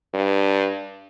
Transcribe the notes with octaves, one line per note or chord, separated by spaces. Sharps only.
G2